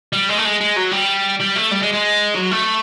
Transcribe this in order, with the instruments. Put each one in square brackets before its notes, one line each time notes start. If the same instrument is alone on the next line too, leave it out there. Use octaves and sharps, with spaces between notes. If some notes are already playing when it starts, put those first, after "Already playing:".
[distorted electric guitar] G3
G#3
A3
G#3
G#3
F#3
G3
G3
A3
G3
G#3
G#3
F#3
A3